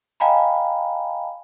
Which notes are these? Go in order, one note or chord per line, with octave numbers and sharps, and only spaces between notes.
D#5 F5 G5 G#5 A#5 B5